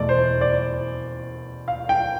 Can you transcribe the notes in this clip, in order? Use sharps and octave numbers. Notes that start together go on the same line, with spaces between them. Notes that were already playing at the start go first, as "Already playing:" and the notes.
Already playing: E2 B2 A3 D5
C5
D5
F5
G5